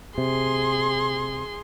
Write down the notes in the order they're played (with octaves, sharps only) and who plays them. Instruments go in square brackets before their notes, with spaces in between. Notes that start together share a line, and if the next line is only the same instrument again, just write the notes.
[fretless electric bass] C3 [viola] G#4 C6